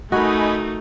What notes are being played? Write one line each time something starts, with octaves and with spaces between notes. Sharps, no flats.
A3 D#4 F#4 A#4 D#5 G#5 B5